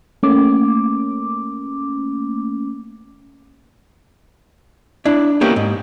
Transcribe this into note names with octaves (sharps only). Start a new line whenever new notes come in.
A3 A#3 C#4 D6
D4 E4
A#3 B3 C#4 E4 G4 A#4
G#2